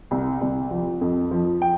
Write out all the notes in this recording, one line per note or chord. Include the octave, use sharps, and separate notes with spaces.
C2
C2
F3
F2
F3
G5